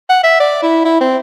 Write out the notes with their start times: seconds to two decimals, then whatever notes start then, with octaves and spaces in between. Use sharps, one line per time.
0.09 F#5
0.24 E5
0.40 D5
0.62 E4
0.85 E4
1.01 C4